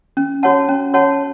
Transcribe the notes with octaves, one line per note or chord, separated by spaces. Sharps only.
C#4
F#4 C#5 F#5 A5
C#4
F#4 C#5 F#5 A5